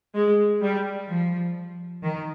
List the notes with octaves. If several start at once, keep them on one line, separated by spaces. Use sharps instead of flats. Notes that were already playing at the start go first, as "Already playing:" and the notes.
G#3
G3
F3
D#3